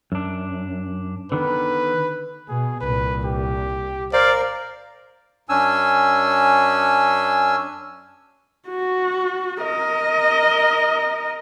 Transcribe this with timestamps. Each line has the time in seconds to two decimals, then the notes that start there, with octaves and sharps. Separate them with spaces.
0.12 F#2 D4
1.32 D3 D#3 B3 B4
2.49 B2 G#4
2.81 C2 A#2 B4
3.25 G4
4.13 A#4 C5 D5 F5
5.49 F#2 C#4 D4 G#5 E6
8.68 F#4
9.62 A#4 D#5